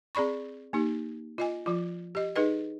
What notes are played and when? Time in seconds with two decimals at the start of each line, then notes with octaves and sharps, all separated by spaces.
0.15 C4 G#4 D5 B5 C#6
0.73 A#3 D#4 G4
1.38 F4 D#5 G#5
1.66 F3 F4
2.15 G4 D#5
2.36 D#4 G#4 B4 D#5